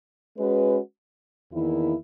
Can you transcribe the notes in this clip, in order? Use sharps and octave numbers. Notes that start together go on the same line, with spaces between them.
G#3 C#4 F#4 B4
E2 D#3 A#3 E4